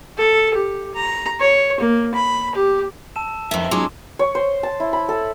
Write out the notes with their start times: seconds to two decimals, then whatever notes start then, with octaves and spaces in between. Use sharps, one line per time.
0.17 A4
0.54 G4
0.95 A#5
1.40 C#5
1.80 A#3
2.14 B5
2.55 G4
3.16 A5 E6 E7
3.51 F2 D#3 B4 C5 E5
3.71 F#3 G#3 C#4 D#4 F4 G#4 C6 D6
4.19 C#5
4.35 C5
4.63 A5
4.80 E4
4.93 B5
5.09 A4